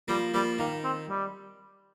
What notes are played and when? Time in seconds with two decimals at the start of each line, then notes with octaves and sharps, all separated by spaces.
0.08 F3 G3 A#3
0.34 F3 G3 A#3
0.59 D#3 A#3
0.84 C4
1.09 G3